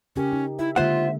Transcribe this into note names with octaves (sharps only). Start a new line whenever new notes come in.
C#3 C#4 G4 A#4
D#4
E4 E5
D3 G#3 A#3 F4 C5 E5 F#5